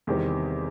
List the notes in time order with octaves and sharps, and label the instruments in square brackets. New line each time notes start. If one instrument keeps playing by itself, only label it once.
[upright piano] E2 C3 D#3 G3 C4